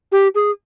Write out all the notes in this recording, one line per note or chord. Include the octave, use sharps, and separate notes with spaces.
G4
G#4